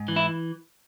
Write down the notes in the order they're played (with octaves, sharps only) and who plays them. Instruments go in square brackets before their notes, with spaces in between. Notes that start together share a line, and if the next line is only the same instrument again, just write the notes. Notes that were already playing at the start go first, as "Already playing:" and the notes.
Already playing: [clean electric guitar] G#2
E3
E4